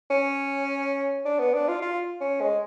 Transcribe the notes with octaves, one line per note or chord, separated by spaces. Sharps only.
C#4
D4
B3
D4
F4
F4
C#4
G#3